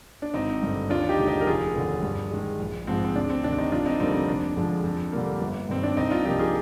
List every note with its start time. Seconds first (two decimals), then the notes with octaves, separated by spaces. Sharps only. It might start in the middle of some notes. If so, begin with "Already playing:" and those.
0.22 D4
0.34 G#1 C4 D#4
0.63 G2 D3
0.90 D#2 D4 F4
1.09 D#4 G4
1.19 D3 G#3
1.28 D#4 G4
1.41 A#4
1.47 F1 F4 G#4
1.75 D#2 D3
2.03 G2
2.31 D#3 G#3
2.60 A#1
2.87 G#2 F3 G#3 C4
3.05 C4
3.15 D2 D4
3.30 C4
3.44 C3 D#3 D4
3.58 C4 D#4
3.72 F1 D4 F4
3.86 C4 D#4
4.00 F2 D3 G3 A#3 C4
4.14 C4
4.28 F1 D4
4.57 F2 D3 F3 G#3
4.84 F2
5.12 D3 G3 A#3
5.41 G1
5.69 G2 D#3 C4
5.83 D4
5.97 C2 C4 D#4
6.10 D4 F4
6.25 C3 F3 A#3 D#4 G4
6.39 F4 G#4